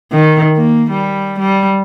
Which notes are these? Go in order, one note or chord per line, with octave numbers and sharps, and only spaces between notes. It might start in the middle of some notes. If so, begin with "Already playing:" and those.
D#3
A#3
G3
G3